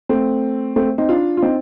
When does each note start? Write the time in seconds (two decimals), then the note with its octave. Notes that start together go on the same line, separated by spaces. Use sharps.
0.09 A3 C4
0.76 A3 C4
0.98 C4 D#4
1.09 D4 F4
1.37 F4
1.42 C4 D#4